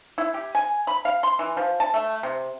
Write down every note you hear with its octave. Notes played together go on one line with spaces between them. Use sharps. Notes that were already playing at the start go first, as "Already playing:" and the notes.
E4
G4
G#5
B5
F5
C6
E3
F3
A5
A3
C3